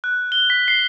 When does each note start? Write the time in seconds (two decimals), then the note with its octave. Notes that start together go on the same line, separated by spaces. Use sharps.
0.04 F#6
0.32 G7
0.50 B6
0.68 C7